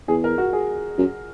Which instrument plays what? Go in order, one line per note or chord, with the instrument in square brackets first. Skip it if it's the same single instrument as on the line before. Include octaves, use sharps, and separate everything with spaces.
[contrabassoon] E2 [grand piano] G#4
[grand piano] A#4
F#4
G#4
[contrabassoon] F#2